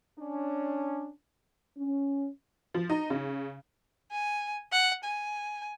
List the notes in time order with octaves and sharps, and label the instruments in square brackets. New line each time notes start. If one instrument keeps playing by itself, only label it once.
[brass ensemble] C#4 D4
[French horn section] C#4
[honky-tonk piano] F3
D#4
C#3
[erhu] G#5
F#5
G#5